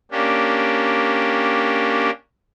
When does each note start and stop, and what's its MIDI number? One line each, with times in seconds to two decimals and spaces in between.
0.11 2.11 58
0.11 2.11 61
0.11 2.11 62
0.11 2.11 67